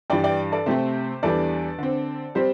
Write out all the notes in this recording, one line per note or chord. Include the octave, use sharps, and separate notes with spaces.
G2 E3 G3 D5 G5
D5 G5
A4 D5
C3 A3 C4 G4 C5
E2 E3 G3 D4 A4 D5
D3 C4
G3 C4 G4 C5